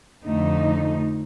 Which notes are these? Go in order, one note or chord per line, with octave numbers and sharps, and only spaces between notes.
F2 D3 A3 D#4